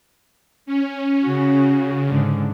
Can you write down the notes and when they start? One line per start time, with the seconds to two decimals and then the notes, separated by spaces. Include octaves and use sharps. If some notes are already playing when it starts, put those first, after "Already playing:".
0.66 C#4
1.26 C#3 C#4 F#4
2.09 G#2 D3